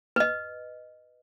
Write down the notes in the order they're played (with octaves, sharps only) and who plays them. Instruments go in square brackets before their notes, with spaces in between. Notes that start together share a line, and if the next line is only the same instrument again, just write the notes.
[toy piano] B4 D#5